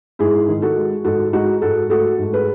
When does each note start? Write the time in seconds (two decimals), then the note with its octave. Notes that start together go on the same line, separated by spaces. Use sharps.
0.19 G#2 E4 G#4
0.48 D#3
0.62 F#4 A4
0.77 G#3
1.04 G#2 F#4 A4
1.33 G#3 D#4 F#4
1.62 G#2 F#4 A4
1.90 A3 F#4 A4
2.18 G#2
2.33 G#4 B4